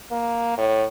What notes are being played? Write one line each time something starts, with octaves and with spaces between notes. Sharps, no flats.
A#3
A2